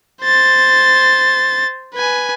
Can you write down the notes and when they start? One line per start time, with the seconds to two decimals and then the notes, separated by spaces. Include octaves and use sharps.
0.23 C5 A6
1.95 B4 G#5